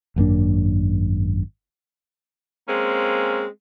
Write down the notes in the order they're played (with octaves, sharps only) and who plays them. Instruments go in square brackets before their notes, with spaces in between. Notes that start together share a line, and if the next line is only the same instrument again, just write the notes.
[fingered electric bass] G#1 F#2 A#3 D4
[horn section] G#3 A#3 C4 C#4